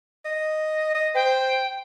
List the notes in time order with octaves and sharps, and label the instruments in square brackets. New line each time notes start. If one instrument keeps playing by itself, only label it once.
[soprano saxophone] D#5
D#5
[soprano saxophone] C5 [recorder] G5